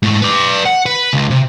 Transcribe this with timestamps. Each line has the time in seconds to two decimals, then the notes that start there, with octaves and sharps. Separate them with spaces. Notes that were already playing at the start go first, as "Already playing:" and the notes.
0.03 G#2 A3
0.22 B4 D5
0.66 F#5
0.86 B4
1.13 C#2
1.31 C3